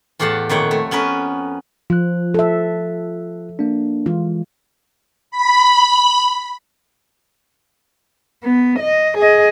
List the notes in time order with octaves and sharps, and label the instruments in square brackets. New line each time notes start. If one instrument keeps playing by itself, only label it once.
[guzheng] E2 A2 G4 F5 F#5 A5
F2 A#2 D#3 C#5 F#5 G5
A3
B3 C#4 A#4 B4
[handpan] F3 [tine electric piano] F4 F#6
[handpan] A4 E5
[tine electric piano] A#3 D4
[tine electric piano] E3 G#3 [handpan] F4
[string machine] B5
[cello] B3
D#5
G#4 D#5